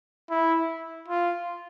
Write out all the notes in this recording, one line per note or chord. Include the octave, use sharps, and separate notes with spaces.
E4
F4